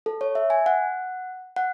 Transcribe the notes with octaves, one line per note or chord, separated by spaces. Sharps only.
A4
C#5
E5
G#5
F#5
F#5